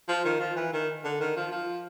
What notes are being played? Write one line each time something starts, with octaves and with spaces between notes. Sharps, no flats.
F3
D#3
F3
E3
D#3
D3
D#3
F3
F3